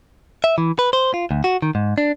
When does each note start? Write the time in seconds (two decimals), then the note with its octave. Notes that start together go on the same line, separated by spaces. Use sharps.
0.44 E5
0.58 E3
0.79 B4
0.93 C5
1.14 F4
1.31 D2
1.44 F#4
1.62 D#3
1.75 G#2
1.98 D4